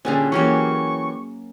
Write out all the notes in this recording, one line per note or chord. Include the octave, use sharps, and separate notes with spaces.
A#2 D3 G3 C#4 G#4
E3 F#3 A#3 C#4 G4 C#6